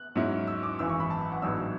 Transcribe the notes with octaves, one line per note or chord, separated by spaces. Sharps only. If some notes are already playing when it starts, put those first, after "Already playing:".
Already playing: F#6
G#2 F#3 C#4 E4
E6
D6
G#1 F#2 E3 E6
C#6
B5
A5
F#5
A1 G#2 F#3 B3 D4 E6